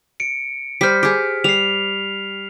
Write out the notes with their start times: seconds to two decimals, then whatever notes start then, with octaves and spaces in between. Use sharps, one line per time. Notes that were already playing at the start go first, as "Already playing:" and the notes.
0.20 C#7 D7
0.81 G3 C5 F6 B6
1.03 G4 G#4
1.44 G3 C7 F7